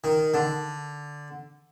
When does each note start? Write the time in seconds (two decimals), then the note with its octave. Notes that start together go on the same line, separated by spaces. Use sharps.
0.04 D#3
0.34 D3